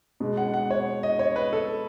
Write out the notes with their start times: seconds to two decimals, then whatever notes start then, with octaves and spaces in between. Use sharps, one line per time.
0.20 B2 G#3
0.37 F#5
0.54 F#5
0.70 C#5
1.03 D#5
1.19 C#5
1.36 B4
1.53 A4